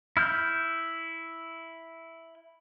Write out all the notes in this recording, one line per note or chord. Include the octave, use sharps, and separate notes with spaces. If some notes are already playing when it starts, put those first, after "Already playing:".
E4 F6 G6